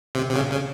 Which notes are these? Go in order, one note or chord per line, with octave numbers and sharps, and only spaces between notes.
C3
C3
C#3
C#3